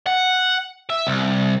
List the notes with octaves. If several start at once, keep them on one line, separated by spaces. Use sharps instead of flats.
F#5
E5
C2